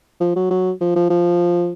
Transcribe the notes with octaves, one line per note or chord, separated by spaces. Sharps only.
F3
F#3
F#3
F3
F3
F3